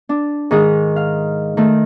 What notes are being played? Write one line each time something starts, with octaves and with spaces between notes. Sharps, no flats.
D4
G#2 D#3 G#3 G#4
F5
D#3 A3